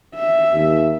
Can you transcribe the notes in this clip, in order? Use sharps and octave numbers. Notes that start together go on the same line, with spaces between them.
E5
D#2